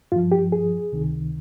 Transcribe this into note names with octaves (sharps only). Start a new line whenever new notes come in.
G2 F3 F4
G4
G#4
C#2 C3 D#3